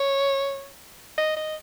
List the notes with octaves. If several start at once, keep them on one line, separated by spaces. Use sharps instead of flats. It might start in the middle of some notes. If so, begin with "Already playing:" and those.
Already playing: C#5
D#5
D#5